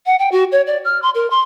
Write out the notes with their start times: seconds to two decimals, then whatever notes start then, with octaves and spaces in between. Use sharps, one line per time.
0.06 F#5
0.19 G5
0.32 F#4
0.52 C#5
0.67 D5
0.85 F6
1.02 C6
1.15 A#4
1.30 C6